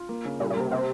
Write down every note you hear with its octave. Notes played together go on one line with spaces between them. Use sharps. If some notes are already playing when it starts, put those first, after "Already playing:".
Already playing: F4
A#3
C#3
A#2 G3
A#2
C3 A#3
C3 C4